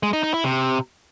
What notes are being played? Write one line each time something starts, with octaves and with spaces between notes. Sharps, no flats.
G#3
D#4
D#4
E4
C3